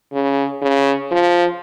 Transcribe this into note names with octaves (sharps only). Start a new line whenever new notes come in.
C#3
C#3
F3